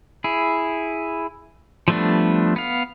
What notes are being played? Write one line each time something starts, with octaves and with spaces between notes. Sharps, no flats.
E4 G#4
F3 G3 A3 B3 D4
B3 F5